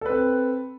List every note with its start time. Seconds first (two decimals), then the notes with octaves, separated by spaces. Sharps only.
0.01 A4
0.06 B4
0.10 C4